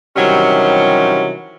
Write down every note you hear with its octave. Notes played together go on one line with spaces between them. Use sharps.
C3 D#3 E3 F#3 G3 C#4